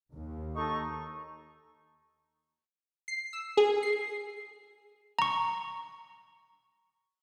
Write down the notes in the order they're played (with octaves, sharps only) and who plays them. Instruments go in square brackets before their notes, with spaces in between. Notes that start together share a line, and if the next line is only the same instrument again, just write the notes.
[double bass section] D#2
[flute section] D#4 A4 C#6
[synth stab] C7
E6
G#4
C7
[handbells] A#5 C#6